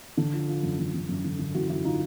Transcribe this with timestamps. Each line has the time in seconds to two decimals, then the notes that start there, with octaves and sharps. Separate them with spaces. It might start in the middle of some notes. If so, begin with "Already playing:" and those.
0.17 D3
0.33 F3
0.48 F3
0.63 F#2
0.79 D3
0.94 D3
1.09 F#2
1.24 D3
1.39 D3
1.54 F#2 E4 F#4
1.69 F#2 E4 F#4
1.85 D3 D#4 F4